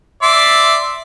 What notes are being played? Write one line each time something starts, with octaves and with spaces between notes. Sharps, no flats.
D5 E5 C6